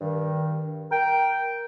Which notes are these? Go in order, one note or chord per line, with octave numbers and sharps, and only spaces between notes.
G2 D#3
A#4 G5